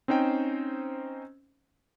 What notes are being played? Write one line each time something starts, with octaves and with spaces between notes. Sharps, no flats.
C4 C#4 D#4 C5 G5